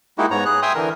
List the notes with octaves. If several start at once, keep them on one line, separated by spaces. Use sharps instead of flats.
G#3 A#3 D#4 E4 F#4 G4
G#2 B3 C#5 A#5
G#4 F#6
E5 G5 G#5 C6 D#6
D3 E3 A#4